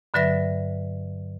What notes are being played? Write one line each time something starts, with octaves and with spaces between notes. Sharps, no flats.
G2 D3 F#3 B4 E5 A#6